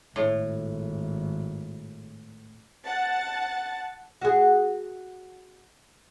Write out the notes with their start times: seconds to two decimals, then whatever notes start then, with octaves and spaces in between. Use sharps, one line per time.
0.16 G#1 A2
2.85 F#5 A5 A6
4.21 F#4 G#4